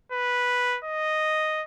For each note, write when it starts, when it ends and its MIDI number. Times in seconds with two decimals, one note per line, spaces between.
0.12 0.78 71
0.84 1.63 75